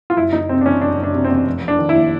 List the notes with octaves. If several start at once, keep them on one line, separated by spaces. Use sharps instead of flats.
F4
F#1 E4
F#1 D#4
C3 C4
D4
E2 C#4
F#1 D4
F#1
D4
C3
C4
E2
F1
F1 D4
D#3
E4
D#2